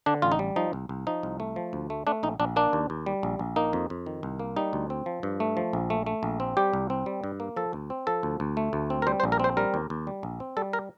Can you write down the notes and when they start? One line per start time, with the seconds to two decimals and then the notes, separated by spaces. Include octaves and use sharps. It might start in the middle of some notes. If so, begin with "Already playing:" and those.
0.06 D3 D4
0.22 A1 F4
0.32 D#4
0.39 G3
0.56 F3 D#4
0.73 C2
0.89 C2
1.07 F3 D#4
1.23 C2
1.40 A3
1.56 F3
1.73 D2
1.90 A3
2.07 A3 D4
2.23 A#1 D#4
2.40 A#1 D4
2.56 A#3 D4
2.73 D#2
2.90 D#2
3.06 G3
3.23 A#1
3.39 A#1
3.56 A#3 D#4
3.73 F2
3.90 F2
4.06 D#3
4.23 C2
4.40 A#3
4.56 G3 D#4
4.73 D2
4.90 C4
5.06 F3
5.23 G2
5.40 A3
5.57 F3
5.73 A#1
5.90 A3
6.06 A3
6.23 A#1
6.40 C4
6.57 G3 G4
6.73 C2
6.90 C4
7.06 G3
7.24 G2
7.40 A#3
7.56 F3 A4
7.73 D2
7.90 C4
8.07 F3 A4
8.23 D2
8.40 D2
8.57 A3
8.73 D2
8.90 C4
9.02 A#4
9.07 G3 C5
9.20 C5
9.24 A#1
9.32 A#4
9.40 C4 C5
9.57 G3 A#4
9.74 D#2
9.90 D#2
10.07 G3
10.23 A#1
10.40 C4
10.57 G3 A4
10.73 A#4